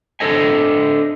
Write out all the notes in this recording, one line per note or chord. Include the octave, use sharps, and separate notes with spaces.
D4 A4 C5 D#5 G#5